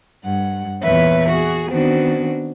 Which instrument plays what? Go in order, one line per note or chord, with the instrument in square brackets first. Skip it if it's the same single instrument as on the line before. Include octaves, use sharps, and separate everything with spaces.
[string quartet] G2 F#5
E2 A#2 B4 C#5 E5
F#4 G#4
D#3 B3 C4 D4 F#4